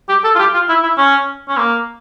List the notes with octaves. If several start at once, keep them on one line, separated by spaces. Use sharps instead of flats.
G4
A4
F4
G4
F4
E4
E4
C#4
C#4
A#3